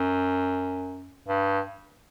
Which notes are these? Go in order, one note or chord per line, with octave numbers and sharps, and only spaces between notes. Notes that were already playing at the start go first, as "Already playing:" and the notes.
Already playing: F#2
G2